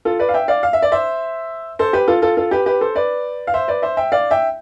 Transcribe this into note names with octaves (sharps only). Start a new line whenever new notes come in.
F4 A4
B4 D5
F5
E5 G5
D5 F5
F5
E5
D5
C5 E5
A4 C5
G4 B4
F4 A4
F4 A4
F4 A4
G4 B4
G4 B4
A4 C5
B4 D5
F5
C5 E5
B4 D5
C5 E5
E5 G5
D5 F5
E5 G5